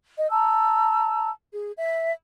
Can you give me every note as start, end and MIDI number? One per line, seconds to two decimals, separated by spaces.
0.17 0.29 75
0.31 1.29 81
0.31 1.29 82
0.31 1.29 88
1.53 1.71 68
1.77 2.11 76